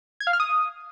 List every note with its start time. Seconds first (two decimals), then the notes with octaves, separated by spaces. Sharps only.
0.20 G#6
0.27 F5
0.33 F6
0.40 D#6